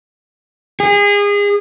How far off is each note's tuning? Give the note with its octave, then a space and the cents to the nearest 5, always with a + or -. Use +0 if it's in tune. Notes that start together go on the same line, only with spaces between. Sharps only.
G#4 -30